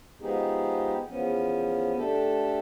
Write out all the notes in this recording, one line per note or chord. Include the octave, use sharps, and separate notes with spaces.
F3 G#3 B3 D#4 G4 G#4
E2 F3 B3 C#4
A3 D4 G4 A4